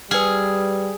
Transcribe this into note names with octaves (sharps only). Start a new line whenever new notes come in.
G3 G#4 B4 F6